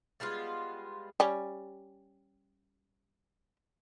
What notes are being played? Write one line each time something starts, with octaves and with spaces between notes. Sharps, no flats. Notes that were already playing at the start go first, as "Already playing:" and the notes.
G3 G#3 B3 F4
G3 C#4